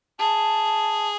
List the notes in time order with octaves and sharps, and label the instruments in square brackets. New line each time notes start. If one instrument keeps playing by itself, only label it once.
[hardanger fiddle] G#4 [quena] A5